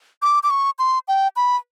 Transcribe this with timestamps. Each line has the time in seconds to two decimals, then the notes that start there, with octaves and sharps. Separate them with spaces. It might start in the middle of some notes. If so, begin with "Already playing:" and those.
0.22 D6
0.43 D6
0.50 C#6
0.79 C6
1.08 G5
1.36 B5